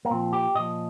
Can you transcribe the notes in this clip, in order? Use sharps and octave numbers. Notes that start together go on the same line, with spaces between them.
A#3
A#2 F3 C4
G4
A#2 F3 D#5